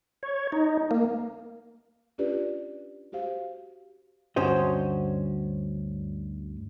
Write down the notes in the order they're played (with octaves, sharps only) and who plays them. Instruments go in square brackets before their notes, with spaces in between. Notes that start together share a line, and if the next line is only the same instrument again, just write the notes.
[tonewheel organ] C#5
D#4
A#3
[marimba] C#4 D4 F4 G4 B4 D5
F#4 G4 C5 F5
[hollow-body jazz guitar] D2 G2 C#4 F#4 C5 D#5